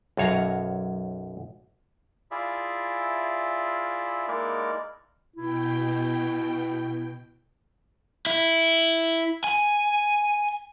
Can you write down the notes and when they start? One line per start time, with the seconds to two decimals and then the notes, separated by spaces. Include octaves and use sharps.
0.17 B1 F#2 C#5 F5 A#5
2.31 E4 F4 G#4 D5 E5
4.28 G#3 A#3 D#4 E4 A#4 D5
5.36 B2 E4 G5
8.26 E4
9.44 G#5